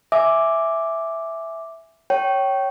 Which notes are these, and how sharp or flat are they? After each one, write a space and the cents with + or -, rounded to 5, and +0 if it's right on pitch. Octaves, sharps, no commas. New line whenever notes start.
E5 +0 G#5 +0 D6 +0
C#5 -5 G5 -25